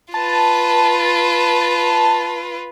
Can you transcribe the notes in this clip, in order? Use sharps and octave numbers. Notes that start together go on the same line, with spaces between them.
F4 B4 A5